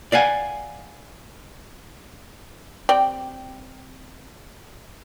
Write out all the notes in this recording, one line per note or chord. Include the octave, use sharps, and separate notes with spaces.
D5 F5 F#5 G#5
C4 G4 D5 G5